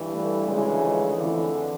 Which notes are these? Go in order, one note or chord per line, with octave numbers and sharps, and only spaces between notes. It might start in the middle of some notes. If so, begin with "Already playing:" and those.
Already playing: G2 E3
A3
D2 C#3 E3 G#3
F3
F2 D3 E3